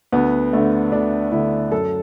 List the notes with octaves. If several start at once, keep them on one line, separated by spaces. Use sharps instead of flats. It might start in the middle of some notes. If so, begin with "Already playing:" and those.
D2 B3
D3 A3
D2 D4
D3 A3 E4
F#2 A4